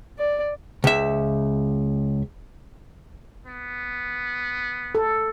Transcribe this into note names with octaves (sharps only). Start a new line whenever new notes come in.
D5
C#2 E5
B3
A4